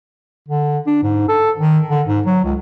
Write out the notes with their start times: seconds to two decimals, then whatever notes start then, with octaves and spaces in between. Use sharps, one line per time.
0.49 D3
0.87 D4
1.03 G#2
1.29 A4
1.57 D#3
1.90 D3
2.07 G#2
2.26 F#3
2.44 C#2